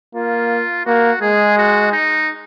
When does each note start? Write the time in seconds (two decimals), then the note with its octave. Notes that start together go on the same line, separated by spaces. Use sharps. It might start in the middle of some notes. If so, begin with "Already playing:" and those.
0.15 A#3 F4
0.86 A#3 F#4
1.21 G#3 G#4
1.57 F#4
1.92 D#4